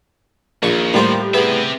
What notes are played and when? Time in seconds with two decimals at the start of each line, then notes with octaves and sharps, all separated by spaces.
0.63 A#1 D#2 C#6
0.94 A2 G3 A#3 F4 G4 C5
1.34 B3 C4 G#4 E5